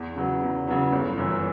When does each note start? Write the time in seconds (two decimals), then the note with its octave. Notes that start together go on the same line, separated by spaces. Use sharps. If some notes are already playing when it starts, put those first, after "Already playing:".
Already playing: E2
0.16 C#3 F#3 B3
0.41 E2
0.67 C#3 F#3 B3
0.93 G1
1.17 F#2 E3